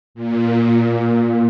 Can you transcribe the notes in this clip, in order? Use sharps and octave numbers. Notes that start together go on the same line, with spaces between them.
A#2